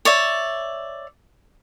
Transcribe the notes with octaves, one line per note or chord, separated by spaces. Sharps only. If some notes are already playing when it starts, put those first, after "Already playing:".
C#5 D5 E5